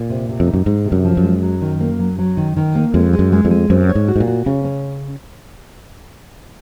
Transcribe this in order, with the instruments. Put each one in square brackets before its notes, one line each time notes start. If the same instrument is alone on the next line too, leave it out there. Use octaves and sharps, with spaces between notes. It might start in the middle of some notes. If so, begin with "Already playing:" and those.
Already playing: [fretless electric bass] A#2
[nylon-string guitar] C3
C3
[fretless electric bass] F2
[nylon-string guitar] D#4
[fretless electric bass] F#2
[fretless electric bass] G#2 [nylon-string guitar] G#3
[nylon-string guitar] C3
[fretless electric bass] F#2
[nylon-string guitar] F3
[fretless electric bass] F#2
[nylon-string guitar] G#3
F#3
D#3
A#3
F#3
F#3
D#3
D#3
A#3
[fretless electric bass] F2 [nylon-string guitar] G#3
[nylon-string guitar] G#3
[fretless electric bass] F#2
[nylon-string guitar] G#3
[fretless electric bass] F2
[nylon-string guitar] G#3
[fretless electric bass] F#2 [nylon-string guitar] C4
[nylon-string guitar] C#5
[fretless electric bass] G#2
[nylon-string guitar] F#4
[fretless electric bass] G#2
A#2
[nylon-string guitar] F#4
[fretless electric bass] C#3 [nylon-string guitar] C#4
[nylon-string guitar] C#4